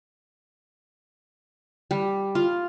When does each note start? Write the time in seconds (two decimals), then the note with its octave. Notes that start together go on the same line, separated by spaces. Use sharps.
1.91 G3
2.35 F4